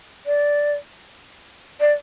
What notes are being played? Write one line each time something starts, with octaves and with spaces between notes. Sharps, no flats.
D5
D5